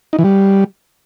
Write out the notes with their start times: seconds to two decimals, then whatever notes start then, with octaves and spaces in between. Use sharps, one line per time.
0.13 D#4
0.19 E3
0.24 G3